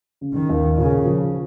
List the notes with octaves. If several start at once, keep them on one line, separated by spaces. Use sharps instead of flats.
C#3
D#3
D#2
A#2 C#3
F3